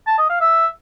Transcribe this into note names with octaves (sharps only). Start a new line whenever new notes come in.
A5
D#5
F5
E5